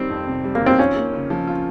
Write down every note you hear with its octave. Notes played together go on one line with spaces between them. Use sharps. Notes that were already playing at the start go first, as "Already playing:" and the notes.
Already playing: D#3 G3 C4
F2
C3
G3
A#3
D#3
C4
C#4 F4
A#3
C#3
F3
F4